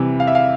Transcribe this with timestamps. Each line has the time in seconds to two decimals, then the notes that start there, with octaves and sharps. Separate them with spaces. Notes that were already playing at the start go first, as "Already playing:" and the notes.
Already playing: C3 E3 G3
0.20 F5
0.27 E5
0.35 F5